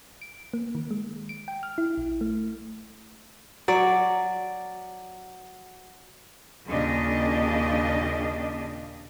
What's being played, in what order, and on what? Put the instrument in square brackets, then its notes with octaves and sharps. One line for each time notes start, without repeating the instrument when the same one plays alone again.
[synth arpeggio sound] D7
A#3
D#3
G#3
D7
G5
F6
E4
A#1
A3
[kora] F#3 D5
[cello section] D#2 A#2 C#3 D4 G4 D#5